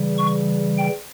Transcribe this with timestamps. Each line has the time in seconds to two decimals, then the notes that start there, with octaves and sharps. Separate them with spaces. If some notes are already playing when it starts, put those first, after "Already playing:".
Already playing: C#3 E3 G3
0.18 C#6
0.78 G5